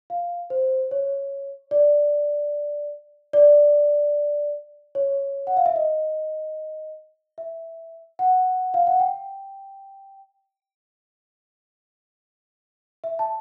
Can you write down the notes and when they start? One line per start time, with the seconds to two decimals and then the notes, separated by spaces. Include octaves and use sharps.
0.10 F5
0.50 C5
0.91 C#5
1.71 D5
3.33 D5
4.95 C#5
5.47 F#5
5.57 F5
5.66 E5
5.76 D#5
7.38 E5
8.19 F#5
8.74 F5
8.87 F#5
9.00 G5
13.04 E5
13.19 A5